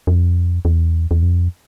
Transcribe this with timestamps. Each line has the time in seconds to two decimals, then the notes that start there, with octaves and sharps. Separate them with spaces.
0.07 F2
0.65 E2
1.11 E2
1.22 F2